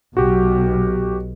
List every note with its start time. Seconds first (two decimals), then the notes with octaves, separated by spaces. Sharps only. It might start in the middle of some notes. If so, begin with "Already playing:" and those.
0.17 B1 F#4 G4